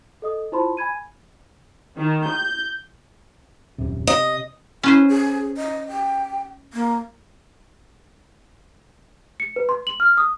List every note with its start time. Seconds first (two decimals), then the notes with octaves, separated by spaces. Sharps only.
0.22 A4 D#5 D#6
0.52 E4 F4 C5 A5 B5 C6
0.77 G#5 B5 G#6 D#7
1.98 D#3
2.27 G6
3.78 D#1 F#2 C3
4.07 C3 D#5
4.83 C#4 E4 B4 C5
5.09 G#4
5.57 D#5
5.89 G5
6.73 A#3
9.40 C#7
9.56 B4
9.69 C6
9.87 F#7
10.00 F6
10.17 D#6